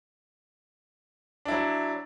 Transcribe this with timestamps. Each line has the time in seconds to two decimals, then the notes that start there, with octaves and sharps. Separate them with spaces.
1.45 D4
1.48 E4
1.51 F#3